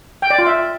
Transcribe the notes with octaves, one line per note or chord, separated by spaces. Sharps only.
G5
D5
F4
E5